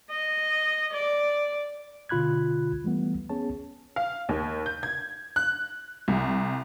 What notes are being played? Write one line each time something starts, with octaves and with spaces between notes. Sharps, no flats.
D#5
D5
B2 D3 F4 B5 F#6 G#6
E3 G3 A3 B3
B3 C#4 G#4 C#5 A5
F5
D#2
G6
G#6
F#6
C2